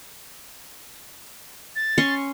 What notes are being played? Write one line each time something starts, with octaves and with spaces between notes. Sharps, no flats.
A6
C#4 C6 C#6